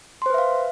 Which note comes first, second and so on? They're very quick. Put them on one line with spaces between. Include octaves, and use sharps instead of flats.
C6 C5 B4 E5 F5